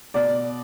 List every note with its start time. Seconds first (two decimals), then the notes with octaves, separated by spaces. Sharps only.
0.14 B2 D5